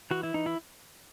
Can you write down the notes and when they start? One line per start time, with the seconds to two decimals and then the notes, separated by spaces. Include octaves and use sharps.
0.11 E3 F#4
0.23 E4
0.34 E3 D#4
0.46 E4